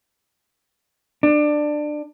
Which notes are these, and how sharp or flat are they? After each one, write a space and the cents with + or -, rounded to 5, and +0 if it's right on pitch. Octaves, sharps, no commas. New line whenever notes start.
D4 +20